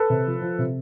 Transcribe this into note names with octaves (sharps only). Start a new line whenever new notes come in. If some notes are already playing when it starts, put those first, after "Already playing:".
Already playing: A4 B4
C3
F3
F3
C3